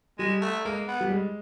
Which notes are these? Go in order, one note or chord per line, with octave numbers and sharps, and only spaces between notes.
G3 G#3
A3
G#3 A#3
B3
G3
G#3